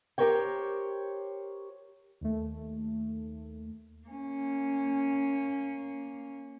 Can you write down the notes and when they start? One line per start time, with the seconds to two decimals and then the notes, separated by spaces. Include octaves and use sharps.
0.18 G4 G#4 A#4 C5 C#5 G5
2.21 D#2 A3
4.08 A#3 C#4